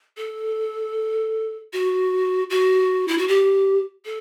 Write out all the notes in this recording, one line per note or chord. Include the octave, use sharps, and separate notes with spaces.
A4
F#4
F#4
E4
F#4
G4
A4